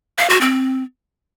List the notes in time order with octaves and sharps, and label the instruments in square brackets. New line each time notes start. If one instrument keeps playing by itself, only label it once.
[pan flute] F5
F#4
C4